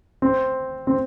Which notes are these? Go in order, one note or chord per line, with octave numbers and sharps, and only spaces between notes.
C4
C4